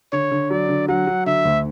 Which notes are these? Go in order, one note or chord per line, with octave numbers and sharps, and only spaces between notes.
D3 C#5
D3
F#3 D5
D3
F#3 F#5
F#3
D3 E5
D2